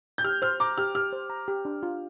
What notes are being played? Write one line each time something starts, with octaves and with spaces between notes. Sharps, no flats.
G6
G4 F6
C5 F6
A#5 D6
G4 F6
G4 F6
C5
A#5
G4
D4
F4